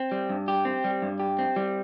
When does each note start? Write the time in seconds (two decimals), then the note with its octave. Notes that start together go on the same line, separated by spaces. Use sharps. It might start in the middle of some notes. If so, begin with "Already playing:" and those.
Already playing: C4
0.12 G3
0.30 G2
0.48 G4
0.65 C4
0.84 G3
1.02 G2
1.20 G4
1.39 C4
1.56 G3